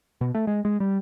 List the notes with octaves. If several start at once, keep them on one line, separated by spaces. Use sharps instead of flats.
B2
A3
G#3
G#3
G3